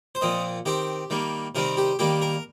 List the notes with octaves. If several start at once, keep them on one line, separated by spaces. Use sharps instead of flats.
C5
A#2 F3 C4 D#5
D#3 C4 G4
D#3 G3 A#3
C3 D#3 G3 C4 A#4
G4
D#3 G3 A#3 G4
A#4